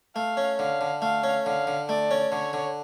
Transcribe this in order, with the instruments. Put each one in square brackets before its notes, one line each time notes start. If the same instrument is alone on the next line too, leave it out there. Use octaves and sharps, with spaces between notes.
[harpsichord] A3 [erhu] F5
[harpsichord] C#4
[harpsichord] D3 [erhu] F5
[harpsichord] D3
[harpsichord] A3 [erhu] F5
[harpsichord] C#4
[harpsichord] D3 [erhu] F5
[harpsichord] D3
[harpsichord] A3 [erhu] D5
[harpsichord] C#4
[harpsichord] D3 [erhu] C#5
[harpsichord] D3